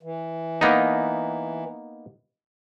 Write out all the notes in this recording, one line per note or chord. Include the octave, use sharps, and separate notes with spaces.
E3
A#3 B3 D#4